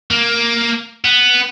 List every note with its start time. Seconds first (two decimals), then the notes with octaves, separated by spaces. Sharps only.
0.10 A#3
1.05 B3